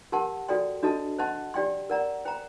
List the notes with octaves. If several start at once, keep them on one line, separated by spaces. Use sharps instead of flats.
G4 A#4 F#5 A5 C6
F#4 A4 D5 G5 C6
D4 F#4 A4 D#5 A5
C5 D#5 F#5 A5 C6
G4 D5 G5 C6
A#4 D5 F#5 A#5
C5 G5 A#5